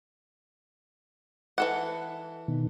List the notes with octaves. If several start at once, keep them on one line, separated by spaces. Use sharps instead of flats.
E3 A4 F#5
B2 D#3